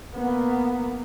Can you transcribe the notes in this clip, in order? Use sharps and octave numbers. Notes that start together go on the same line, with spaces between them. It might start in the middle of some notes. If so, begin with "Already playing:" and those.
A#3 B3